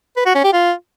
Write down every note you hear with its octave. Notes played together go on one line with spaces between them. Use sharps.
B4
F#4
C#4
G4
F4